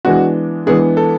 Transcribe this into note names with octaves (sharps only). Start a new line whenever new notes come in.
E3 G#3 B3 D4 F#4
E3 G#3 B3 D4 G#4
A4